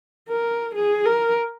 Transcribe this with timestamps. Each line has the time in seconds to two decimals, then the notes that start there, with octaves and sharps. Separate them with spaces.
0.29 A#4
0.75 G#4
1.06 A#4